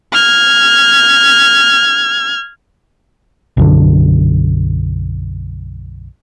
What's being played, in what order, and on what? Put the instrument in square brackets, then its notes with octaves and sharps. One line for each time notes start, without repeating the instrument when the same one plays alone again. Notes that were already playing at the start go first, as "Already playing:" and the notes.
[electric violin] F6 G#6
[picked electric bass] B1 F#2 D3